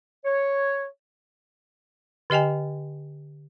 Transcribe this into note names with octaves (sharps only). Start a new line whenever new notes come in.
C#5
D3 G4 D#5 G5 G#5